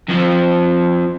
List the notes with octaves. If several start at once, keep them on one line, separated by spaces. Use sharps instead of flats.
F2 F3